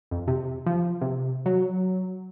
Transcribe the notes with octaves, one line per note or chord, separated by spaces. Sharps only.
F2
C3
F3
C3
F#3